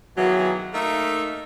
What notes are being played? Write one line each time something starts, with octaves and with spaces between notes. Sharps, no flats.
B2 D#3 E3 F#3 A#3 G#4
A3 A#3 D#4 A#4 E5 F5